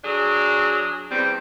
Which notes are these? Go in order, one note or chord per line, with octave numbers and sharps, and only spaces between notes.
F#3 D4 G#4
E2 G3 C4